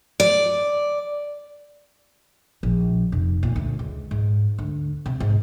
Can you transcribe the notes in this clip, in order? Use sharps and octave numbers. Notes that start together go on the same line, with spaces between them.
D5
A#1
F1
A#2
D2
C#2
G#2
D2
C3
G#2